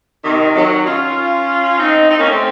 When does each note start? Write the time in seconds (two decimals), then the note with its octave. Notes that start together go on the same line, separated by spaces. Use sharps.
0.25 C3 D#3
0.55 D#3 F#3
0.86 C#4 F4
1.78 C4 D#4
2.09 C4 D#4
2.19 A#3 C#4
2.30 A3 C4